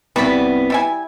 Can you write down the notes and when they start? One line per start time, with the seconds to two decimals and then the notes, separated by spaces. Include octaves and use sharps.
0.16 C2 G3 B3 F#4 D5 E5 B5
0.70 G3 E4 G#5